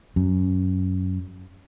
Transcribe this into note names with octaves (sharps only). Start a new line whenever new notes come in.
F#2